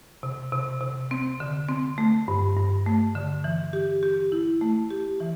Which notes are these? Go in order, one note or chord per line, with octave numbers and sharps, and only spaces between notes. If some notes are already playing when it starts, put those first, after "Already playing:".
C3
C3
C3
C4
D3
C4
A3
G2
G2
A3
D3
E3
G4
G4
E4
A3
G4
E3